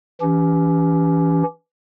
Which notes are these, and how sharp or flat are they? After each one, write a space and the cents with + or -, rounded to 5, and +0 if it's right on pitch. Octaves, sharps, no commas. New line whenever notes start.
E3 +0 C#4 +30 G4 +0